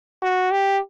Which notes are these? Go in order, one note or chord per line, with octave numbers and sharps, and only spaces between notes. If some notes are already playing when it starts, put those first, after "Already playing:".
F#4
G4